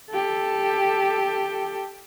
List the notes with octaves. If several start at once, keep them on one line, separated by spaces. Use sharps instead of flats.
G4 A4